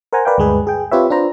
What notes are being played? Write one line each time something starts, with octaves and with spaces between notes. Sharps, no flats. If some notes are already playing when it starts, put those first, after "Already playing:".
A#4 C5 F#5 G#5 A#5
A#4 B4 D5 F5 G5
D2 G2 G#3 G#4 B4
G#4 G5
C4 F4 G4 B4 C#5 E5
D4 F4 B4 C5 A#5